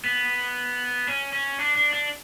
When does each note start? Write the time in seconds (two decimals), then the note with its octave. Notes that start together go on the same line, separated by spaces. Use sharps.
0.04 B3
1.07 C#4
1.33 C#4
1.59 D4
1.76 D4
1.93 D4